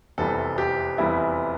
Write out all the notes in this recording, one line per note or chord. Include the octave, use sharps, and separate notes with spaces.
F1 E2 C3 E3 G3 A4
G4
F1 E2 C3 E3 G3 E4